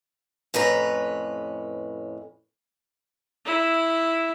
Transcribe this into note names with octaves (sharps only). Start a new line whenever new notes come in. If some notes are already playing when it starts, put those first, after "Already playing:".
F2 A2 C#4 B4 A#5
E4